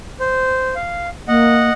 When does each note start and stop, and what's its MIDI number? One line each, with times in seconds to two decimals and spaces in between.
0.20 0.75 72
0.76 1.09 77
1.28 1.70 58
1.28 1.73 75
1.28 1.73 78